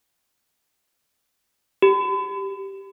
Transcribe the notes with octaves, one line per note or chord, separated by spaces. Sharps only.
G4